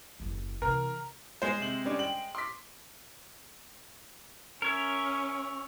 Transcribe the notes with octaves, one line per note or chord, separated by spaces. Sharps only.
F#1 D#2
C3 E3 A#4
G#3 C5
C3 F#7
G3 C#4 D5
G5 F#7
C6 D6 B6
C#4 A#4 C#5 E5